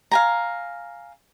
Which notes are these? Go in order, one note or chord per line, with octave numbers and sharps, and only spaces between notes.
F5 G#5 A#5